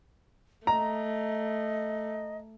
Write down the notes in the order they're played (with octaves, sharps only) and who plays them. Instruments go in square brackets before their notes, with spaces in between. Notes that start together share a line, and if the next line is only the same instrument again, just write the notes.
[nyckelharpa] A3 [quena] D#5 [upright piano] A#5